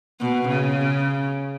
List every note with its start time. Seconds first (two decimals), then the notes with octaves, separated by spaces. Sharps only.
0.20 B2
0.48 C#3